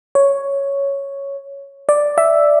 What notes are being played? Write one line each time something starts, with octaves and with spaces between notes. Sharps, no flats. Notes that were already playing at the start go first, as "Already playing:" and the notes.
C#5
D5
E5